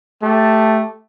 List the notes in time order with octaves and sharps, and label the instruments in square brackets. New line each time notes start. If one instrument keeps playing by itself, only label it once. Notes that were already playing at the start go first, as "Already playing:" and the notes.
[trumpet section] A3 G4 A5